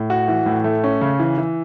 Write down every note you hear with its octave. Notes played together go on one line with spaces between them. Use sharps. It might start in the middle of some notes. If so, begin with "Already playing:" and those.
Already playing: A2
F#4
E3
A2
A3
C#4
C#3
E3
E3